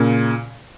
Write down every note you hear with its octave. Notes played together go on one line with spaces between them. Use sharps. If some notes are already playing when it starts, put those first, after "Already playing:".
Already playing: A#2 C#3